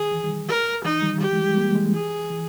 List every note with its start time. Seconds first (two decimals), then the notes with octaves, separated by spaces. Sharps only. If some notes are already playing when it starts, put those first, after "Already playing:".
Already playing: D#3 G#4
0.12 E3
0.23 D#3 G3
0.48 A#4
0.84 E3 D#4
1.02 D#3 G3
1.20 D#3 G3 G4
1.32 E3 G#3
1.42 G3
1.49 G#3
1.57 G3 A#3
1.75 E3 G#3
1.93 E3 G#4
2.30 E3